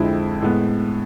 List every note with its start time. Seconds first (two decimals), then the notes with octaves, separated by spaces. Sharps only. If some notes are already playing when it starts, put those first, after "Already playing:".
Already playing: F2 D3 G#3 C4 E4
0.41 A2 G#3 B3